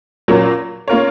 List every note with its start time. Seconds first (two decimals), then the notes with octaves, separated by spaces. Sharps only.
0.28 A#2 F#3 A#3 C#4
0.88 A#3 C#4 F4 A#4 C#5